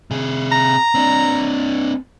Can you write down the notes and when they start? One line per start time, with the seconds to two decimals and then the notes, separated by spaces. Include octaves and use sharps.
0.11 C3 G#4
0.52 A#5
0.95 C4 D4